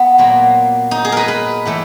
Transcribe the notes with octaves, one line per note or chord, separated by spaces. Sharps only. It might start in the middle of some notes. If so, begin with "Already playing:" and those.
Already playing: B3
A#2 F#3 A#3
D#4
G#4
A#4 B4
B4
A2 E3 A3